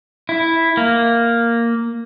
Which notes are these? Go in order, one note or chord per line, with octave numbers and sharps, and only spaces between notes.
E4
A#3